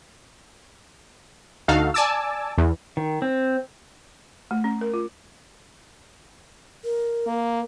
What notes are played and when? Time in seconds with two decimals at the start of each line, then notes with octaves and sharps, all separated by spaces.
1.68 D2 D#4 F#4 A4 F5
1.94 D5 G#5 A5 D6 E6
2.58 E2
2.97 D#3
3.22 C4
4.51 A3
4.64 C#4
4.81 A#4
4.94 F4
6.85 A#4
7.27 A#3